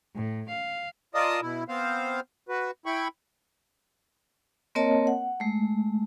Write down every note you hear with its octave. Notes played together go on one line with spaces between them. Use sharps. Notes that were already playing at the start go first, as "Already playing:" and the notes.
A2
F5
F4 A#4 D5 D#5 A5 D#6
B2 E4
B3 C4 C5 F5
F#4 B4
E4 G5 B5 C#6
A#3 C4 A#4 C#5 D#5 A5
F#5
G#3 A3